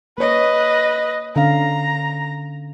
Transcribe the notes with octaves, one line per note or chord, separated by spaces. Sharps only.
A#3 B4 C#5 D#5
D3 C#4 F5 A#5